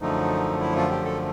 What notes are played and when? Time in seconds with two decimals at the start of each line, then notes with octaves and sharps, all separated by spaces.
0.01 F#2 D3 F3 A3 D#4
0.61 E4
0.76 F4
0.90 G4
1.05 A4